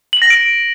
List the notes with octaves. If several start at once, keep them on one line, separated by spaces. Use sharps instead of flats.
F#7
A#6
D7